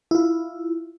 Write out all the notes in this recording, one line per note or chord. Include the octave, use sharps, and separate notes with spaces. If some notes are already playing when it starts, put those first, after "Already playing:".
E4 F4